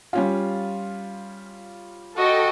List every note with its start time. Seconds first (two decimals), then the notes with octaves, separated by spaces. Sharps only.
0.13 G3 C#4 F4
2.18 F#4 A4 D#5 G5